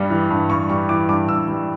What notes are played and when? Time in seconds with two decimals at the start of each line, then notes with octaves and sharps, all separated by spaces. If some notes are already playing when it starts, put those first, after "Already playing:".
Already playing: G2 G3
0.10 E3
0.30 G2
0.50 G2 C#6
0.69 G3 C#6
0.89 E3 D6
1.09 G2 D6
1.29 G2 E6
1.48 G3